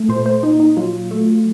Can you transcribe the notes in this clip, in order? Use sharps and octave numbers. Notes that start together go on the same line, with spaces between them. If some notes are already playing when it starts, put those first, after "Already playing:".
Already playing: A3
A#2 C5
C5
A#2 D#4
D#4
F#3 F4
A3